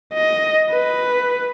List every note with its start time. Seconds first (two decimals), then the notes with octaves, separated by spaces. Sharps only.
0.14 D#5
0.71 B4